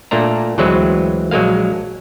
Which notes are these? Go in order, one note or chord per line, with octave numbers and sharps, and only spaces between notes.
A#2 A3 A#3 D4 A#5
D2 E3 F#3 G#3 C4 B4
A#1 F#3 G#3 A#3 F5